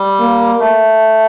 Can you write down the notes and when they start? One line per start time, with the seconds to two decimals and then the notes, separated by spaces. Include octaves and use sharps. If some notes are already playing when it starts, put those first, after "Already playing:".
Already playing: G3
0.20 A#3
0.60 A3